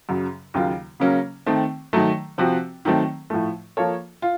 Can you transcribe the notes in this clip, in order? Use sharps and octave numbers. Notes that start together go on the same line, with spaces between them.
F#2 C#3 F#3
D#2 C#3 F#3 A#3 F4
C#3 F#3 A#3 C#4
D#3 A3 C4
D#3 F#3 A3
C3 F3 C4 F#4
D#3 F#3 A3 C4
A2 F3 A3
F3 A#3 F4 A4 C#5
F4